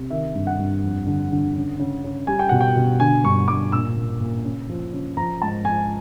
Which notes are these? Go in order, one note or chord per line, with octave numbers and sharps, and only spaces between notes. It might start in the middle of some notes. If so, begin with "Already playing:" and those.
Already playing: C3
D#3 E5
G2
F#5
G2
F2
D3
D3
C#3
C#3
C#3
G3 G#5
G5
B2 F#5
G5
B2
D3 G#5
G2 C#6
G2 D6
A#2 E6
A#2
A#2
C#3
F3
C#3
F3 A#5
G#2 A5
F3 G#5